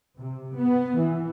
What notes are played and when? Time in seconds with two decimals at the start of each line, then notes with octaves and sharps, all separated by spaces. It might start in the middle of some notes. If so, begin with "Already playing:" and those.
0.17 C3
0.55 B3
0.96 E3